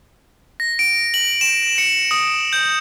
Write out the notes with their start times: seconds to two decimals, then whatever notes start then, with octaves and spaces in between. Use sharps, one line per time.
0.60 A#6
0.79 D7
1.14 F#7
1.41 E7
1.78 C#7
2.11 D#6
2.53 G6